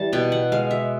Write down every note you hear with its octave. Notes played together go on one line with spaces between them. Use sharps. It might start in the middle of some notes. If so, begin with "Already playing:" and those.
Already playing: E3 G3 A5
B2 G5
F#5
G#3 F5
E5